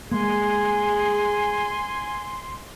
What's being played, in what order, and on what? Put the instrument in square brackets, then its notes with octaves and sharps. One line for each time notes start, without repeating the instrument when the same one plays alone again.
[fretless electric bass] G#3 A#3 [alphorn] G#4 [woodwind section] G#5 [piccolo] C6